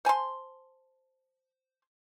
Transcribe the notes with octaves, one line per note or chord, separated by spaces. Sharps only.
C5 G#5 A5 C6